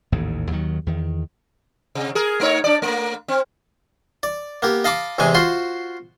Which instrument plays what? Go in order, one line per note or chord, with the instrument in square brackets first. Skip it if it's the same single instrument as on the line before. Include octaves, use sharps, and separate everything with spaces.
[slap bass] A1 D#2 G#2
D#2 D#3 F#3
E2 D#3
[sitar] C3
G#4 A#4
A3 D#4 C#5
D4 D5
A3 A#3
C4
[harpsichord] D5
A#3 B3 G4
D#5 F5 A5 B5 D6
E2 C3 E3 G#3 G#5
F4 F#4 C5 C6